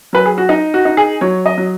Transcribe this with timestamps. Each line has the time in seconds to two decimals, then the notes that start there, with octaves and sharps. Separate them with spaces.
0.13 F#3 B4
0.25 G#4
0.38 F#4
0.49 D#4
0.74 F#4
0.85 D#4
0.97 G#4
1.21 F#3 C#5
1.46 D#5
1.58 F#3